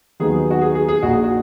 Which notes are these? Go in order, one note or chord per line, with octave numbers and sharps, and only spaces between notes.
D#2 D#3 F#3 B3 D#4 G#4
F#4
G#4
G#4
G#4
A#1 A#2 A#3 D#4 F#4
G#4
F#4